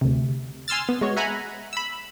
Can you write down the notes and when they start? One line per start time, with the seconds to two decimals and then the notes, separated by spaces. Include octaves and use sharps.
0.01 D2 C3
0.68 G#5 C6 E6 F6 A6
0.89 B3
1.01 G#3 B3 F#4 C#5
1.17 E5 F#5 G#5 A#5 B5
1.73 B5 E6